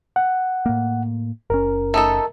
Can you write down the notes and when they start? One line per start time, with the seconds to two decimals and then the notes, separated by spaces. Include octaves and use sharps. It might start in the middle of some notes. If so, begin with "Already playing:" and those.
0.16 F#5
0.66 A2 A#3
1.50 F#1 C#4 A#4
1.94 A3 D#4 A4